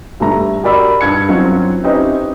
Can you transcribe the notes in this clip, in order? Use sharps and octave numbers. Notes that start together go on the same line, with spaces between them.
G2 G3 A3 A#5
F#4 G4 A#4 D5 B5 E6
G2 G#6 C#7
F#3 C4 C#4 F4
C4 C#4 D#4 E4 G4 B4